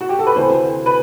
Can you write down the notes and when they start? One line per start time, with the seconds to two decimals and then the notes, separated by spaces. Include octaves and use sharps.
0.01 F#4
0.09 G4
0.19 A4
0.27 B4
0.35 D2 C3 E3 C5
0.86 B4